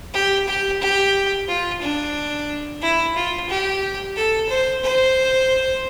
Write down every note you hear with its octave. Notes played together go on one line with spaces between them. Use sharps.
G4
G4
G4
F4
D4
E4
F4
G4
A4
C5
C5